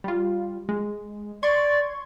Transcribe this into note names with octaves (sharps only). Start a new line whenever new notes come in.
G3 F4
G#3
D5 C6 C#6 G#6